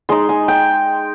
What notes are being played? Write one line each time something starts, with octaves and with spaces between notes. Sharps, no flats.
G#3 D#4 C6
G#5
G5